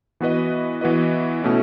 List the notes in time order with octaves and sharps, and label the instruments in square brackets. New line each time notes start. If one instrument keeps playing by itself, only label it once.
[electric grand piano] E3 B3 F#4 B4 D#5
E3 B3 F#4 B4 D#5
B2 A3 C#4 E4